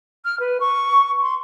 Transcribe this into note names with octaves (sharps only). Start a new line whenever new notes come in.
F6
B4
C#6
C6